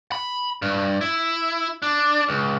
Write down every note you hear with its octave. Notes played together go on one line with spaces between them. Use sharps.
B5
G2
E4
D4
C#2